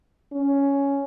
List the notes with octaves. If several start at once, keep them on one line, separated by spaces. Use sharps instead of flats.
C#4